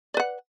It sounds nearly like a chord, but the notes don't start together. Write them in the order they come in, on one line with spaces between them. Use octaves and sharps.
D5 B4 F#5